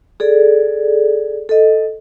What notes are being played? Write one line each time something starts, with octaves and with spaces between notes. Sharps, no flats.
G#4 A4 D5
A4 D#5